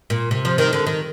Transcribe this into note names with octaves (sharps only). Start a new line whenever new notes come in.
A#2
C3
F3
D#3
D3
D#3